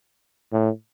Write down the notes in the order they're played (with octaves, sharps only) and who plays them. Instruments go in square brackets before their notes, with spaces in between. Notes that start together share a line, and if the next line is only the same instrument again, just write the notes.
[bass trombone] A2